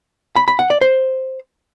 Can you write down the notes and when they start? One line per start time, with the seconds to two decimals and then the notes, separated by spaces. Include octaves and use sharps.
0.36 B5
0.48 B5
0.59 F#5
0.70 D5
0.81 C5